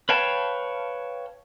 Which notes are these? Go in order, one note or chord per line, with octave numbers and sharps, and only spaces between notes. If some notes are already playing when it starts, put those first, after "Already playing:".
B4 C#5 F5 G5 A5